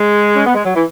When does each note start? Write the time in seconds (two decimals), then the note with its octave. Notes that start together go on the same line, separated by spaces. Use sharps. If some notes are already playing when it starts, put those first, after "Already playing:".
Already playing: G#3
0.36 C#4
0.45 B3
0.55 G#3
0.65 F#3
0.74 E3